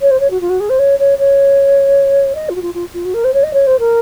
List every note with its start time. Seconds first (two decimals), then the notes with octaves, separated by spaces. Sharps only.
0.01 C#5
0.10 C5
0.20 C#5
0.30 F#4
0.40 F4
0.49 F#4
0.60 G#4
0.69 C5
0.79 C#5
0.99 C#5
1.18 C#5
2.35 D#5
2.49 F4
2.55 F#4
2.61 F4
2.74 F4
2.93 F4
3.04 F#4
3.14 A#4
3.24 C5
3.33 C#5
3.43 D#5
3.53 C#5
3.66 C5
3.79 A#4